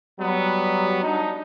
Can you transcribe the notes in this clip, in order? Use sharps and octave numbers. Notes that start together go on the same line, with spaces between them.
F#3 G3 B3
D4 D#4